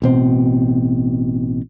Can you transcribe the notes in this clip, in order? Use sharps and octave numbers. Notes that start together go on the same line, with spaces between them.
A1 B2 C4